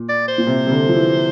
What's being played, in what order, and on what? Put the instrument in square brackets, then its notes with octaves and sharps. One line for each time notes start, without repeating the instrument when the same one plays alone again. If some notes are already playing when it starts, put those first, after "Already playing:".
Already playing: [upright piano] A#2
[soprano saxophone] D5
C5
[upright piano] A#2
C3
C3
D3
F3
E3